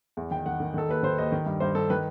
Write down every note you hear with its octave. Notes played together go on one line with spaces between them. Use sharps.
E2
D#3 G5
D#3 F#5
D#3
D#3 A4
D#2 B4
D#3 C5
D#2 D#5
D#3
G2
G2 C5
G2 A4
D#3 B4